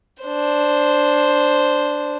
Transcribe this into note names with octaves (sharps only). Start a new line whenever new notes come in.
D4 C5